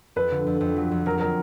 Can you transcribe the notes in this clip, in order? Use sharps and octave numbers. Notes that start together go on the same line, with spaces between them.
F2 B4
D3
F2
F2
F#3
F2
F#3 A#4
F#3 A#4